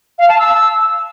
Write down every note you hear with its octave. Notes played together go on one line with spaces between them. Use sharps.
F5
A5
E6